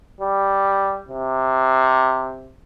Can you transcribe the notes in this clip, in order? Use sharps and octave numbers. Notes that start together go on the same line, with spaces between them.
G3
C3